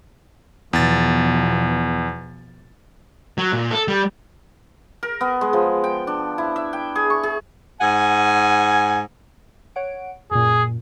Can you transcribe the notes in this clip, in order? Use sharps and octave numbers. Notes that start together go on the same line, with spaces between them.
E2 B2 F3 A6
F#3
A#2
A4
G3
A#4
B3
G#3
F3
G5
D4
E4
E5
G5
G#4
C#6
G#4
G#2 F#5 G#5
C#5 F#5 D7
F#2 A#2 G#4